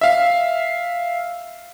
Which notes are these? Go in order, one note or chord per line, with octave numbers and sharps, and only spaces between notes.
E5 F5